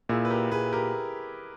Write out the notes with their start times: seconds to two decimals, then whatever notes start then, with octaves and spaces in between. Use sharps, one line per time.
0.09 A#2 E4 G#4
0.25 B4
0.30 G4 A#4
0.51 A#2 G#4 B4
0.73 G4 A#4